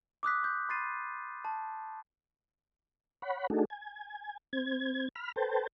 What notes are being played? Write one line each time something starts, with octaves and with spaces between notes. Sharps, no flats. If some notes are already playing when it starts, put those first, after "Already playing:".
D6 D#6 F#6 B6
C6 G6
B5 C6 A6 C7 D#7
A5
C#5 F#5 B5
A3 D4 D#4 F#4 G#4 A4
G#5
C4 G#6
B5 F6
A4 B4 C5 G5 A5